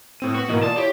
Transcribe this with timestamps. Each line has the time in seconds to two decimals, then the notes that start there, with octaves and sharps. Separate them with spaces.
0.20 A2 C4 D#7
0.35 B3 F#4 B4
0.49 G#2 B2 E3 A#3 D#5
0.64 F4 D5 A5 D#6
0.78 E4 G4 C#5